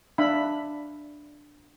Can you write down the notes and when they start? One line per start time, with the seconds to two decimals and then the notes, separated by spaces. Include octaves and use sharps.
0.18 D4 E5 F5 B5